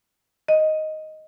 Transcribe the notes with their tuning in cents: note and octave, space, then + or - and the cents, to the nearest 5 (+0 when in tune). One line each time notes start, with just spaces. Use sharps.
D#5 +5